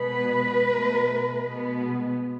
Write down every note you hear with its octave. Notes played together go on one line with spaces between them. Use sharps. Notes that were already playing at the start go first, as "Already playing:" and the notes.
Already playing: B2 G#3 B3 B4
B2 A3
B2 G#3 B3